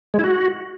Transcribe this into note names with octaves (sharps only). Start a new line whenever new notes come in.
G#3
E4
F#4